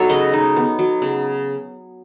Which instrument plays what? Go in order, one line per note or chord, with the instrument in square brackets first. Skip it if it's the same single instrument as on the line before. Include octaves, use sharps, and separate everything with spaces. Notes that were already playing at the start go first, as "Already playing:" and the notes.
Already playing: [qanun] F#3 B3 D#4 A4 C#5 F#5
C#3 B4 D#5
D#4
B3
F#3
C#3